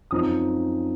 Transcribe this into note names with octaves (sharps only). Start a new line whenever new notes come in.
F#2 F3 C4 D#4 D#6